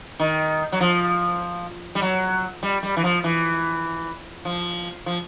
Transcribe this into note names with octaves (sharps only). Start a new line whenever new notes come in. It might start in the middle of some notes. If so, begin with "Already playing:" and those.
D#3
F#3
F3
G3
F#3
G3
G3
E3
F3
E3
F3
F3